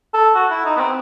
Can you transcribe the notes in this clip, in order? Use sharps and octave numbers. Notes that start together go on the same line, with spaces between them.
A4
F#4
E4
D#4
B3
C4